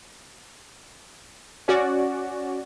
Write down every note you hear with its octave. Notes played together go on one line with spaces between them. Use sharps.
C#4 F#4 D5